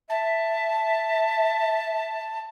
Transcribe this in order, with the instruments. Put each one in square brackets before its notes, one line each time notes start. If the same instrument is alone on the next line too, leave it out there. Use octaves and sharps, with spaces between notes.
[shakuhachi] E5 [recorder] A5